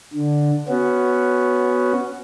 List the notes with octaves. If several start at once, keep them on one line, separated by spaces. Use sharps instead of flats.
D3
B3 C#4 F#4